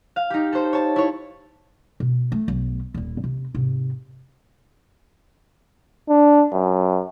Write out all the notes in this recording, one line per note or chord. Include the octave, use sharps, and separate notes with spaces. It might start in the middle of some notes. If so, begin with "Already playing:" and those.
F5
D#4 G4
A4 C5
C#5 A5
E4 C#5
B2
A3
B1
D#1 E4
C3
G#2 C3
D4
F#2